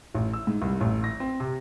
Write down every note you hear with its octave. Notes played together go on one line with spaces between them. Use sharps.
A1
E6
G#2
C2
A1
A#6
C4
C3